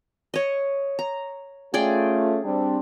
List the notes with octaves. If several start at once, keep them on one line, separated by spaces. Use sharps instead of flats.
C#5 D#5
A#5
A3 C#4 F4 G#4 D5 G5
G3 C4 D4